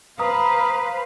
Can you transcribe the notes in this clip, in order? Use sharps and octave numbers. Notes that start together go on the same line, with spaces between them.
B4 C5 F5 A#5 D#6